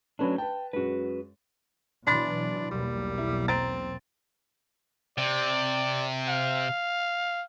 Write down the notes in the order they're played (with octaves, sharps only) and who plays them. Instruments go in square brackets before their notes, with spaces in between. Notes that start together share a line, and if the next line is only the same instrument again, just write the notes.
[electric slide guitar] F#3 C#4 D4 [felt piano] A3 B4 B5
[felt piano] B4 A5 [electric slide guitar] G5
[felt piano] F#2 G#3 [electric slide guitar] F#4 B4
[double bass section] B2 E3 F#3 [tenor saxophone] D4 [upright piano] B5 C6 A6
[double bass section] B1 E2 A#3 [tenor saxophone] G3
[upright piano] E4
[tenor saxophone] C4 [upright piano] A#5 A6 D7
[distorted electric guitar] C3 [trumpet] D5
[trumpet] F5